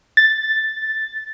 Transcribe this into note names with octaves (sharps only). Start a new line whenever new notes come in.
A6